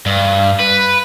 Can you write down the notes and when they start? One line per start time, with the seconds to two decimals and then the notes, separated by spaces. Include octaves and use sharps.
0.06 G2
0.60 B4